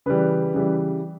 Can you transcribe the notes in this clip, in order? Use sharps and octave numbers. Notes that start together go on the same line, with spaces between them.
C#3 E3 G3 B4
C#3 E3 G3